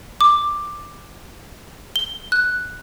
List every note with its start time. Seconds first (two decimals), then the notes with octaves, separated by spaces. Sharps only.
0.21 D6
1.96 G7
2.32 F#6